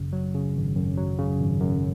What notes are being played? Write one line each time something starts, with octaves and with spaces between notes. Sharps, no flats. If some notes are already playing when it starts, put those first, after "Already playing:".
Already playing: G#1 F#2 C#3
F#3
C#3
G#1
F#2
F#3
C#3
G#1
F#2